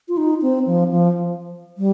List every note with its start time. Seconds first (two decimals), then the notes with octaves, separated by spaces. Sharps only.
0.08 F4
0.17 D#4
0.42 C4
0.66 F3
0.91 F3
1.78 G3